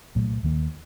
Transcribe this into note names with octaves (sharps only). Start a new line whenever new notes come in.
C2 A#2 F#3 A3
D#2 D#3 A#3